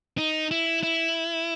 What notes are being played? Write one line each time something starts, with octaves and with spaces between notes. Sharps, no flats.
D#4
E4
E4